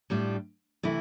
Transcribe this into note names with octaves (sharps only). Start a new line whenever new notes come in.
A2 G3 D4 F4
C3 E3 A3 E4